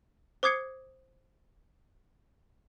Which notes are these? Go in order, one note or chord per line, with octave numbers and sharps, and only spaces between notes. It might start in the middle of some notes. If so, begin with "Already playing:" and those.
C5 D6 D#6 G#6 C7 C#7